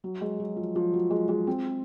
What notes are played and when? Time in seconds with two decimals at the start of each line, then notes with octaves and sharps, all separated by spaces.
0.04 F#3
0.21 G#3
0.40 F#3
0.57 F3
0.76 F3
0.94 F#3
1.11 G#3
1.29 G#3
1.47 C4